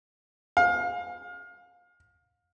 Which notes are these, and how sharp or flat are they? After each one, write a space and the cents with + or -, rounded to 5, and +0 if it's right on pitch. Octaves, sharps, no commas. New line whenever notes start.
F5 +30